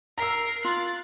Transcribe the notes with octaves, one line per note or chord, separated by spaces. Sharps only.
A#4 A#5 E6 C7
F4 F#6 A6